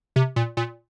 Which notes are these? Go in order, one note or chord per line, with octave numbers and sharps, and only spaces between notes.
C3
A#2
A#2